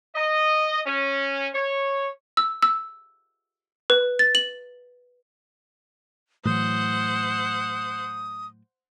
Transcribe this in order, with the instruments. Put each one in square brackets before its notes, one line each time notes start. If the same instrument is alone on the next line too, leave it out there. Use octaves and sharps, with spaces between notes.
[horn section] D#5
C#4
C#5
[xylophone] E6
E6
B4
A6
F#7
[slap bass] A2 E3 F#3 [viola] C5 F#5 [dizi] D#6